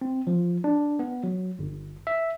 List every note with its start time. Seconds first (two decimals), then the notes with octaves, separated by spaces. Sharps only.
0.01 C4
0.27 F3
0.64 D4
0.99 B3
1.24 F#3
1.59 G1
2.07 E5